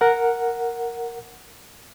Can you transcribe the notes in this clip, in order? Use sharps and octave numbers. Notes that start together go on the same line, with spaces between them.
A#4 F#5